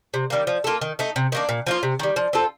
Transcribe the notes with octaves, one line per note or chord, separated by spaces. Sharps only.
C3
D#3 G3 A#3
F3
A#3 F4 A4
D#3
A3 D#4
C3
D#3 A#3 D4
A#2
F3 A#3 F4
C3
D#3 G3
F3
C4 F4 A4